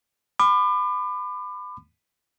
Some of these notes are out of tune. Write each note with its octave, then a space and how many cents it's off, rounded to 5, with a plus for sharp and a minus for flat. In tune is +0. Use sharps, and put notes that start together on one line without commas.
B5 +25 D6 +35